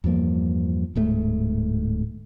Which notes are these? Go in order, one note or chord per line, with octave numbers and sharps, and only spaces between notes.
E2 G2 F3 A#3
D1 G#2 A3